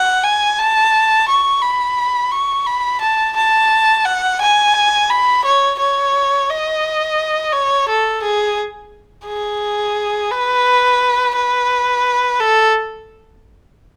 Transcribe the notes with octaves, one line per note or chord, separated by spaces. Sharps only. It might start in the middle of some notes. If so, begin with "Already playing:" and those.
Already playing: F#5
G#5
A5
C#6
B5
C#6
B5
A5
A5
F#5
G#5
B5
C#5
C#5
D#5
C#5
A4
G#4
G#4
B4
B4
A4